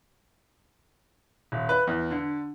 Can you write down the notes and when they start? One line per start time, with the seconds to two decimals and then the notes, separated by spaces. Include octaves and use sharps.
1.52 D#1
1.69 B4
1.87 E2
2.11 D3